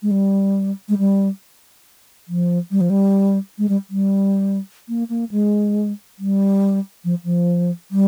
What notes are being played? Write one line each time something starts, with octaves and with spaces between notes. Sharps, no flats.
G#3
G3
G#3
G3
F3
G3
F3
G3
G#3
G3
G3
A#3
A#3
G#3
G3
F3
F3
G3